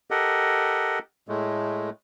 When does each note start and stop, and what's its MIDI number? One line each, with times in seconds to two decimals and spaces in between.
0.10 0.99 67
0.10 0.99 69
0.10 0.99 70
0.10 0.99 75
0.10 0.99 78
1.28 1.90 45
1.28 1.90 56
1.28 1.90 57